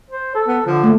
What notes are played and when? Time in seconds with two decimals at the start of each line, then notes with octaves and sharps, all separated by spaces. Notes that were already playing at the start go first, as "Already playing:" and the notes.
0.10 C5
0.35 A4
0.48 B3
0.66 D3 F3
0.83 A3 A#3